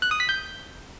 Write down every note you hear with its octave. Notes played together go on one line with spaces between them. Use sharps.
F#6
D#6
B6
G6